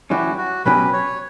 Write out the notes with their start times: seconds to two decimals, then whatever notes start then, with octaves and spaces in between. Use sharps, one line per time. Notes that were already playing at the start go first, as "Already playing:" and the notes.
0.10 E3 G3 C#4 E4 F#4
0.38 F#4
0.65 B1 B2 F#3 C#4 G4 B4
0.93 C#5